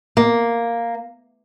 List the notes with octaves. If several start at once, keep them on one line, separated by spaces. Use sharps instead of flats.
A#3